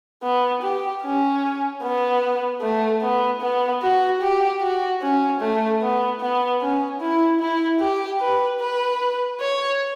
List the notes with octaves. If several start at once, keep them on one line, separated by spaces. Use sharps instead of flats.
B3
G4
C#4
B3
A3
B3
B3
F#4
G4
F#4
C#4
A3
B3
B3
C#4
E4
E4
G4
B4
B4
C#5